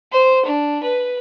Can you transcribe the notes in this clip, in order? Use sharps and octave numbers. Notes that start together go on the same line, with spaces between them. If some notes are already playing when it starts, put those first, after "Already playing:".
C5
D4
B4